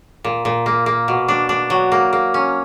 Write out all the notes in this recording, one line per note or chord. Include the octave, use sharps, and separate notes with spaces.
A#2
A#2
A#3
A#3
B2
D4
D4
F#3
A#3
A#3
C#4